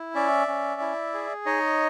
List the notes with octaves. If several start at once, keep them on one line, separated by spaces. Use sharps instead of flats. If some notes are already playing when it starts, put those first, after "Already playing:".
Already playing: E4
C#4 D5 E5
C#4
E4
G#4
D#4 C#5 D#5